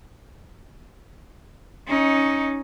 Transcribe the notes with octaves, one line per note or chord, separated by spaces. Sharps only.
C#4 D#4